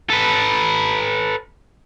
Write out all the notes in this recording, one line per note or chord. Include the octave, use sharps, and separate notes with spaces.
A4 B4